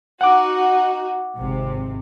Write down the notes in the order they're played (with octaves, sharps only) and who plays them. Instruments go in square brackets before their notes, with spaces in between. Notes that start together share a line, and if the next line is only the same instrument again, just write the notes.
[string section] D#4 F#4 [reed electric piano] F#5 D6
[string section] G#1 C3